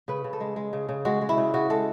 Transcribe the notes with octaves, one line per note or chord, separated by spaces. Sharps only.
C#3 B4
C#3
A4
G#3
G#3
C#3
C#3
G#3 F#4
G#3
E4
C#3
C#3 F#4
G#3 A4